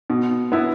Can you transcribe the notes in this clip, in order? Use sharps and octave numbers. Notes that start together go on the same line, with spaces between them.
B2
B3 E4